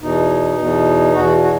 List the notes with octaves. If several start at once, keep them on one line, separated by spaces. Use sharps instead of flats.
E2 B2 D#4
E2 B2
E2 B2 F#4
F#4